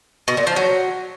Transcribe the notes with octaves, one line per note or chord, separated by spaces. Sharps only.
B2
A#2
F3
F#3